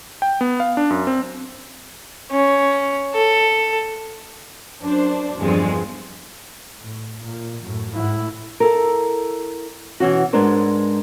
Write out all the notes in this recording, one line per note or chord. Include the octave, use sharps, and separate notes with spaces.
G5
B3
F5
D4
F#2
C4
C#4
A4
F#2 D4 C5
E2 G2 D3 F3 G#3 C4
A2
A#2
F#2 A2
A2 E4
E4 A4 A#4
B2 E3 C#4 F#4
G#2 G#3 B3 D4 A#4 C5